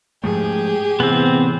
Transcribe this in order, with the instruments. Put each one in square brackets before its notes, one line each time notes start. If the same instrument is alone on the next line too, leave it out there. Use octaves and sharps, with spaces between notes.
[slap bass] G#2 F3 A3 [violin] G4 G#4
[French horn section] A2 E3 [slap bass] C3 [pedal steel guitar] B3 C4